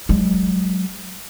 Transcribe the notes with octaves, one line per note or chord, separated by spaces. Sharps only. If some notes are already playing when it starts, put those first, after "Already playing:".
F#3 G#3